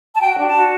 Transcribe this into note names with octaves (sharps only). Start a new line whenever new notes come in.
A5
F#4 G5
D4
A5
F#4